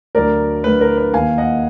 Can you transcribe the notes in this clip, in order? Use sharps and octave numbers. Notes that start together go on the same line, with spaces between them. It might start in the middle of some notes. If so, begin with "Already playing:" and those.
D2 D3 F#3 A#4 D5
D2 D3 F#3 B4
A#4
B4
D#2 D#3 A#3 F5 G#5
D#5 F#5